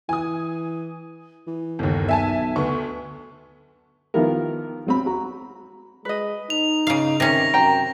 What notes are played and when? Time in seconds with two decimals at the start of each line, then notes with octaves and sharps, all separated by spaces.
0.09 E3 G#5 D#6
1.47 E3
1.79 G1 D#2
2.09 B1 E5 G#5 A5
2.56 D2 B3 C#6
4.14 D#3 F3 B3 E4 G4 A#4
4.86 F#3 C4 B5
5.06 F#4 A#5
6.05 G#3 B4 D#5
6.50 D#4 F7
6.87 C#3 F5
7.20 C3 D#3 C#4 A#6
7.54 F#2 C5 G5 A#5